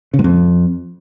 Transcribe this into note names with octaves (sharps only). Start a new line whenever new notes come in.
C#3
G#2
F2